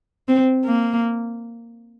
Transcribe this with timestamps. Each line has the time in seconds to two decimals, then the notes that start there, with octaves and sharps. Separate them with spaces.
0.28 C4
0.65 A#3